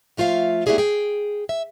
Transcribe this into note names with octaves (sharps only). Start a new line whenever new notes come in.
F3 A3 F4 E5 F5
A3 B3 E4 G4 G#4 D5
G#4 G5
E5